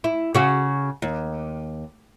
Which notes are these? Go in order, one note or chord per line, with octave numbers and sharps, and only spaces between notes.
E4
C#3 F#4
D#2